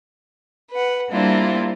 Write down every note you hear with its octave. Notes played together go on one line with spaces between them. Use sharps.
B4 F#5
G3 A#3 C4 D4 E4 F4